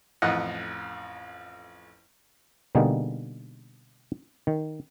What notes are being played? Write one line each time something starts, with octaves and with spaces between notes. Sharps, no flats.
A1 F2 D#5 F#5
B2 D3 G3 A#3 D#4 G#4
D#3